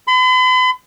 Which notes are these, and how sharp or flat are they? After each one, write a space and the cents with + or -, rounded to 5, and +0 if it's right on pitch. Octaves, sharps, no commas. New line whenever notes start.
B5 +45